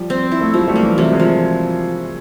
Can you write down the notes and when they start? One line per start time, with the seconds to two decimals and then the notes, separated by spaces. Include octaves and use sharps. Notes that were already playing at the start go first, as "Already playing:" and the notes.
Already playing: F3 G3
0.10 C4
0.32 E4
0.41 A3
0.54 F3 F#3 G#3
0.68 G3 A3
0.76 A#3
0.83 E3 F#3
0.97 C3 E3 F#3
1.12 F#3 G#3
1.20 F3